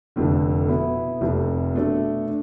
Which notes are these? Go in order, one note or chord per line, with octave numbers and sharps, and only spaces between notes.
F1 F2 D3
B2 B3 E4
F1 F2 C3
B2 A3 D4 A4
D4